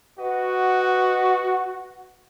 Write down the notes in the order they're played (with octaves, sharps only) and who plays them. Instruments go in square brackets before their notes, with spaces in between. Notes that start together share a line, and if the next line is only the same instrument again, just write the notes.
[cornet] F#4 [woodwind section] B4 D#5 F#5